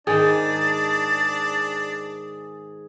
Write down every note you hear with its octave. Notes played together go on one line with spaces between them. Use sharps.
G#2 D#3 D4 G#4 A6